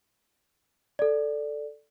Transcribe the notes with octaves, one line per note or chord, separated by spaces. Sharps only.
A4 D5